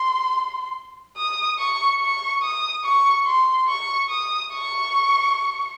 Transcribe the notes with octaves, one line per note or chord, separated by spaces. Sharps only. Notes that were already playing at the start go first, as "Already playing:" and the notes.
Already playing: C6
D#6
C#6
C#6
D#6
C#6
C6
C#6
D#6
C#6